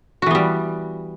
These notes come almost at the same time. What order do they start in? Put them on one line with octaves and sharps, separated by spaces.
F#4 E3 B3 G3